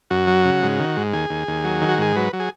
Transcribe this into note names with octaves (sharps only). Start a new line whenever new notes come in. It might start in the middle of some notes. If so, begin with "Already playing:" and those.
F#2 F#4
F#3
C#3
G#2
D#3
G#2
D#2 G#4
D#2
D#2
F#3
D#3
F#4
G#2 G#4
F#3 B4
F#3
G#4